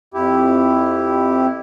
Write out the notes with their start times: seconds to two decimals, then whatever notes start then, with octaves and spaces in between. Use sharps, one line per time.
0.14 F2 E4 G4